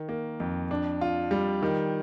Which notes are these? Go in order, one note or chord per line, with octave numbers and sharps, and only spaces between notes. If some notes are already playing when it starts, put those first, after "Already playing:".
Already playing: D#3
A#3
F2
D4
F4
G3
D#3